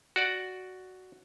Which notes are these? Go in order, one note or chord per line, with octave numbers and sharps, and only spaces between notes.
F#4 D5 F#5